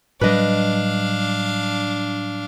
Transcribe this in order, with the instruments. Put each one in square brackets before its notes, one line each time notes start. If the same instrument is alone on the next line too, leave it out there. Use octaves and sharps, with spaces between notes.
[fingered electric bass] A2 F#3 G3 [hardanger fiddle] D4 F5 [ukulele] B4 D#5